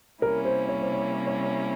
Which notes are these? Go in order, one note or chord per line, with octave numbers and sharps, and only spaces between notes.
C3 G3 A#3 C#4 E4 A#4
C5
C#5
C5
C#5
C#5